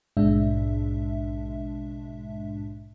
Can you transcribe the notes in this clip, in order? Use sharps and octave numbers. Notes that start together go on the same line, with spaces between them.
A#1 G#2 B2 G#3 D4 E5